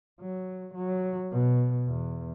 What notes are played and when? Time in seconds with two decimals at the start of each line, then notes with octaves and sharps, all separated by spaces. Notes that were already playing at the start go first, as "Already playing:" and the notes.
0.21 F#3
0.75 F#3
1.31 B2
1.87 E2